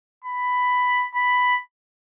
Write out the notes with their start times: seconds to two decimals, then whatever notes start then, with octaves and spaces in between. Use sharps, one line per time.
0.24 B5
1.15 B5